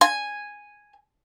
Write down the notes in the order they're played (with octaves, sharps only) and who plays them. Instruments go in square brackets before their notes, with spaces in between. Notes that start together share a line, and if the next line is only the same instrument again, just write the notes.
[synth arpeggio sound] F5 C6 [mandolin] G#5